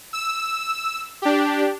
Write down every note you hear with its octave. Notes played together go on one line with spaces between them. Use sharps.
E6
D4 G4